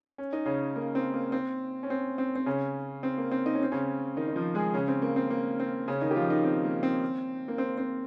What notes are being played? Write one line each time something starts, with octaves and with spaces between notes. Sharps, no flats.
C#4
D#4
C#3 C#4
A#3
C4
A#3
C4
C#4
C4
C4
C4
C#3 C#4
C4
A#3
C4
D#4
C#4
C4
C#3 C#4
D#3 D#4
D#4
F3 F4
G#3 G#4
C#3 C#4
C4
A#3
C4
A#3
C4
C#3 C#4
D#3 D#4
G4
F3 F4
D#3 D#4
C4
A#3
C4
A#3
C4
C4